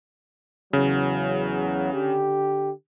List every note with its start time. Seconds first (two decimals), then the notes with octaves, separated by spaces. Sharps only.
0.73 E2 C#3 F#3
1.93 D3 G4